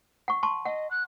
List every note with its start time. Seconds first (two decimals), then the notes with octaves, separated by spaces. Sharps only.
0.28 F#5 C#6
0.43 A5 C6 C#6
0.66 D#5 F#5
0.91 F#6